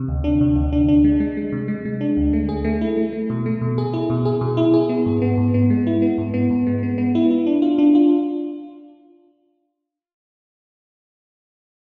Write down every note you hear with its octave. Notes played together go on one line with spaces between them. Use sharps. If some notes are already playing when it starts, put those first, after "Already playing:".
Already playing: C3
D2
D4
C3
D2
D4
D4
G#3
G#3
G#3
C3
G#3
G#3
D4
D2
A3
G#4
A3
E4
A3
A3
B2
A3
B2
G#4
E4
B2
G#4
B2
E4
G#4
B3
G#2
B3
G#2
B3
G#3
E4
B3
G#2
B3
G#2
G#3
B3
B3
E4
E4
D4
F4
D4
F4